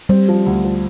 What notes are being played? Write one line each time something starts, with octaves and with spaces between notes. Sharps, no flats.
G3 C4
F3
D2
F3